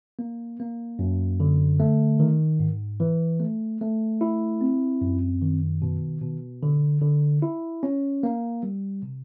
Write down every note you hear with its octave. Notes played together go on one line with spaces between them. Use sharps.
A#3
A#3
F#2
D3
A3
D#3
G#2
E3
A3
A3
E4
C4
F#2
D#3
B2
B2
D3
D3
E4
C#4
A#3
G3
C3